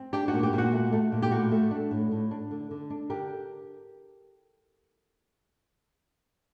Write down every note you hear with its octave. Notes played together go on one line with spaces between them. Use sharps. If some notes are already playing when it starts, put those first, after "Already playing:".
Already playing: C4
D4 G4
F#4
A#2
G4
A#2
F#4
A3
A3
A#2
G4
A2 F#4
A3
D4
A2
A2
D4
D3
D3
D4
D3 G4 A#4